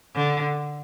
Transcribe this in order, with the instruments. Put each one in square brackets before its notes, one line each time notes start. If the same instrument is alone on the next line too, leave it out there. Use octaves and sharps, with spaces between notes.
[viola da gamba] D3